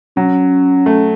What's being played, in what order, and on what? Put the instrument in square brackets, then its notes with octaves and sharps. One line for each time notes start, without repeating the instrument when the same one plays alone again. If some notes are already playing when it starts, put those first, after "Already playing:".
[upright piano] F#3 [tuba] C#4
[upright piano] A3